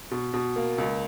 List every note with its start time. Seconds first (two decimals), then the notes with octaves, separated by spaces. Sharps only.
0.11 B2
0.34 B2
0.56 A#3
0.78 C#2